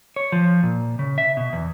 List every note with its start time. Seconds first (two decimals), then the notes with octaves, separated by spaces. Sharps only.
0.16 C#5
0.32 F3
0.63 A#2
0.99 C#3
1.18 E5
1.37 B2
1.53 E2